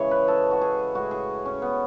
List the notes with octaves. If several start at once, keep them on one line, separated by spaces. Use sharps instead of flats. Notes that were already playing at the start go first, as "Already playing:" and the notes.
Already playing: C#3 E3 G#3 G#4 C#5
B4
A4
F#4
G#4
A2 G#3 F#4
G#4
C#4
B3